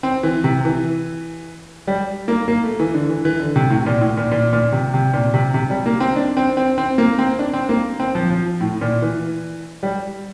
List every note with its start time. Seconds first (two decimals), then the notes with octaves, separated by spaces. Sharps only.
0.03 C4
0.23 E3
0.44 C3
0.65 E3
1.87 G3
2.28 A#3
2.48 A#3
2.64 A3
2.80 E3
2.94 D3
3.09 E3
3.25 E3
3.40 D3
3.56 C3
3.70 A2
3.86 A#2
4.01 A2
4.17 A#2
4.32 A#2
4.53 A#2
4.72 C3
4.94 C3
5.14 A#2
5.34 C3
5.54 C3
5.70 G3
5.86 A#3
6.00 C4
6.16 D4
6.37 C4
6.57 C4
6.78 C4
6.98 A#3
7.19 C4
7.39 D4
7.53 C4
7.69 A#3
8.00 C4
8.15 F3
8.30 F3
8.61 A2
8.81 A#2
9.02 E3
9.83 G3